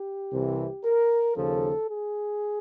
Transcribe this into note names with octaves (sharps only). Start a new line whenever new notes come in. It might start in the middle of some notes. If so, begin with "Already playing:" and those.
Already playing: G4
C2 C3 E3
A#4
D#2 C#3 F3 A4
G#4